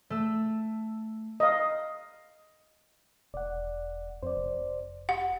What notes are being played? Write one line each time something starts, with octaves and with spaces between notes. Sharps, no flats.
A3 E6
D#5 F5
E1 D5 F#5
F2 C5 D5
F1
G4 F#5